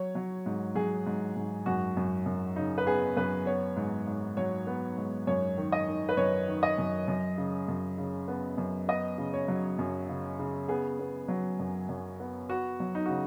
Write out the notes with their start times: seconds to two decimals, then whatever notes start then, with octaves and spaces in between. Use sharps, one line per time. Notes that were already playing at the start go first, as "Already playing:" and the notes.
Already playing: F#3 C#5
0.15 F#3
0.46 G#2
0.75 F#3 G#4
1.06 G#2
1.36 G#2
1.66 F#2 F#4
1.97 F#2
2.26 F#2
2.56 C#3 D#4
2.78 B4
2.87 B3 G#4
3.17 F#2 B4
3.46 B3 C#5
3.76 G#2
4.07 G#2
4.37 F#3 C#5
4.67 B3
4.98 G#2
5.27 F#2 C#5
5.57 D#3
5.72 D#5
5.88 D#3
6.09 B4
6.17 F#2 C#5
6.48 D#3
6.63 D#5
6.78 F#2
7.08 F#2
7.38 C#3
7.68 F#2
7.98 C#3
8.28 B3
8.58 F#2
8.88 B3 D#5
9.18 C#3
9.34 C#5
9.48 F#3
9.79 F#2
10.09 C#3
10.39 C#3
10.68 B3 G#4
11.00 B3
11.28 F#3
11.59 F#2
11.89 F#2
12.20 B3
12.49 B3 F#4
12.80 F#3
12.95 D#4
13.06 C#3 F#4